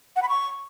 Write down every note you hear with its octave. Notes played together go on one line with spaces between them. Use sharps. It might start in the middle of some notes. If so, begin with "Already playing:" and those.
F#5
B5
C#6